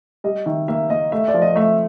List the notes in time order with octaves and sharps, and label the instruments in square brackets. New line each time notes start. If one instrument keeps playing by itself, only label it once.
[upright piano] G3 [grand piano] D#5
[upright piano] D#3 [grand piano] E5
[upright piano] A#3 [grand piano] E5
[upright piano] A#3 [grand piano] D#5
[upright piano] A3 [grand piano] E5
[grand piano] D5
[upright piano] F3
[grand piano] D#5
[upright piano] A3 [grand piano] E5